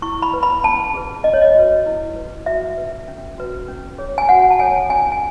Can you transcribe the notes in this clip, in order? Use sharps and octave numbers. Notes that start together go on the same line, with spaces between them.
E4 C#6
B5
B4
B5
C#4 A5
G#4 B4
C#4 D#5
C#5
D#5
F#4 B4
E4
B4
F#4 E5
B4
C#4
F#4 B4
C#4
G#4 C#5
G#5
F#4 F#5
A5
A4 C#5 G#5
C#4 G#5
G#5